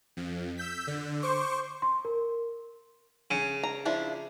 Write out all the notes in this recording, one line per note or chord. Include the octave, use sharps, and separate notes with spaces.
F2
E6 G6 B6
D3
C5 C#6 D6
C6
A#4
C#3
A#5
F3 D4 E4